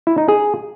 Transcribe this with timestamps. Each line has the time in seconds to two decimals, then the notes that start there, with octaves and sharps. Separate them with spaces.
0.07 E4
0.18 D#4
0.28 G#4